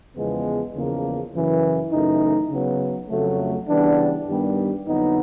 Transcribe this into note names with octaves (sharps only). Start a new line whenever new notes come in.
E2 C#3 F3 G#3 B3
E2 C#3 F3 A#3
F#2 C#3 E3
F#2 C#3 E3 A3 D#4
C#3 F#3 B3
F2 C#3 F#3 A3
C#3 E3 G3 B3 D4
G2 D#3 G3 B3
F2 D3 F#3 B3 D#4